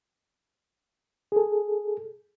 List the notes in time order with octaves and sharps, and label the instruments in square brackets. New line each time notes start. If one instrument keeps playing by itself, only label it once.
[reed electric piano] G#4 A4